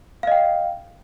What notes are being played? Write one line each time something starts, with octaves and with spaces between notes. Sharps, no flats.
D#5 F5 G5